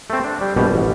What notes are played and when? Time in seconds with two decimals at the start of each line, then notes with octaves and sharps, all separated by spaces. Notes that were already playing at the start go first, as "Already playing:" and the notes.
0.10 A3 C4
0.24 D4
0.41 G3
0.56 A#1 B2 G3
0.72 A1